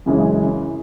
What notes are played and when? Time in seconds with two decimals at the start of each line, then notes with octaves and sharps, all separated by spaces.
0.06 F#2 C#3 E3 G#3 C#4